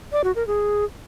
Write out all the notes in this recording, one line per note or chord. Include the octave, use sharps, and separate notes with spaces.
D5
F#4
A#4
G#4